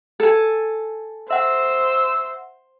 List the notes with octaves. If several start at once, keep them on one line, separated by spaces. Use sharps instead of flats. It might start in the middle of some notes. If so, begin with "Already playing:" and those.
A4 G#5
C5 E5 F#5 E6